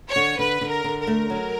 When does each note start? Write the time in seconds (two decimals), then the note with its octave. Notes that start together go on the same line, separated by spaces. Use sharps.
0.08 C#5
0.16 D3
0.38 D3 B4
0.61 D3
0.69 A#4
0.84 D3
1.00 A#4
1.07 A3
1.30 F#3